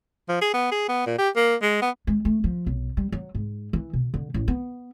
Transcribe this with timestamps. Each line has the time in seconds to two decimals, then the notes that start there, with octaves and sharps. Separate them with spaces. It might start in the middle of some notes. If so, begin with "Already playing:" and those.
0.29 F3
0.42 G#4
0.54 B3
0.72 G#4
0.89 B3
1.06 A#2
1.18 G4
1.36 A#3
1.62 G#3
1.82 B3
2.07 G#3
2.25 A3
2.44 F3
2.66 B1
2.97 G3
3.12 F#3
3.35 G#2
3.73 E3
3.93 B2
4.14 D3
4.34 A1
4.48 B3